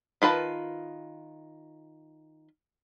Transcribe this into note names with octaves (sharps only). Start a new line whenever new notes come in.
D#3 F4 B4 A5